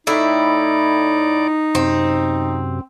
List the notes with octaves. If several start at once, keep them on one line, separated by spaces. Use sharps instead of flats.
A2 D#4 E4 D5
F#2 C3 C4